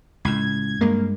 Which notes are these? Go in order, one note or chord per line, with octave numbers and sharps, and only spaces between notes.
C#2 A2 G#6
G2 G#3 A#3